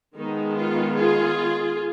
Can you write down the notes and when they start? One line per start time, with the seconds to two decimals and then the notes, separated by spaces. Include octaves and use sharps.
0.17 D#3 G#3 B3 D#4
0.56 F4
0.96 F4 G#4